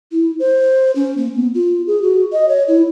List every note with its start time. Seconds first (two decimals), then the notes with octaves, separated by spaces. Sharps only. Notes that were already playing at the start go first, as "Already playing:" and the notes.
0.11 E4
0.39 C5
0.95 C#4
1.17 A#3
1.34 B3
1.54 F4
1.87 G#4
2.02 F#4
2.32 D#5
2.48 C#5
2.68 E4